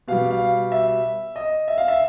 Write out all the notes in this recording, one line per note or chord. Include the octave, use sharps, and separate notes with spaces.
B2 G3 F5
F5
E5
D#5
E5
F5
E5